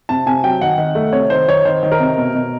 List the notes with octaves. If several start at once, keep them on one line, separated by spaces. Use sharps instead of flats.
C3 A5
C3 G#5
F#3 G5
D#3 F#5
D#3
A3
C3 C#5
D#3 C5
D#3 C#5
D#3 C5
D#3
A#4
C3
B2
B2